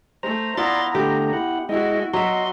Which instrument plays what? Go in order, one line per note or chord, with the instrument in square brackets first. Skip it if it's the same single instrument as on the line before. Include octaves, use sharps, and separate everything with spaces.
[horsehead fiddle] A3 [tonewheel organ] C5 A#5
[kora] B3 E4 F4 [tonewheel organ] D5 C6 A6 [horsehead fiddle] A#5
[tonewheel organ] D3 A3 [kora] G4
[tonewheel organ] E4 F#5
[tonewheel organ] G#3 D#5 [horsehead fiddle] E4 F#4
[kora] F#3 E5 [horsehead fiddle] F#4 [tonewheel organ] D#5 C6